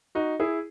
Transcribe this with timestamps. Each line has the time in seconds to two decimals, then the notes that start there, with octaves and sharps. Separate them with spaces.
0.15 D#4 F#4
0.40 E4 G#4